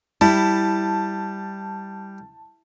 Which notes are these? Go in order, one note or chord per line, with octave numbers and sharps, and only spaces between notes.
G3 E4 A5